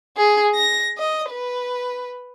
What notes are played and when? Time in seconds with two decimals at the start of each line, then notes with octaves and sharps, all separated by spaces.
0.18 G#4
0.56 A#6
0.98 D#5
1.31 B4